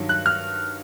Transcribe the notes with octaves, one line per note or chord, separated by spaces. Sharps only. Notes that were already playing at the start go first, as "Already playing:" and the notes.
Already playing: G2 D#3 F#3
F#6
F6